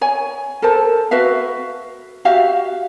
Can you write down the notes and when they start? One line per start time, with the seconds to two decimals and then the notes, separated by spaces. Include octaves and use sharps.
0.01 C#5 G#5
0.62 A4 A#4 C5 A5
1.11 F#4 B4 E5 F5
2.25 F#4 G4 E5 F5